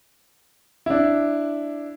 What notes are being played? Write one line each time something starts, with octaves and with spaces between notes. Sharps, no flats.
D4 E4